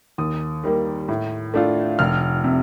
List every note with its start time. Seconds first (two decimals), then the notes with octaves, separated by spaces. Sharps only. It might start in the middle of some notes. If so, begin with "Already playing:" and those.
0.18 D#2 D#6
0.64 D#3 G3 A#3
1.08 A2
1.54 A3 D4 F4
1.99 F1 F6
2.44 C3